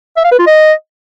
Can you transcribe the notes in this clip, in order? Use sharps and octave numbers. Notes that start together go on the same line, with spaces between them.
E5
F5
B4
F4
D#5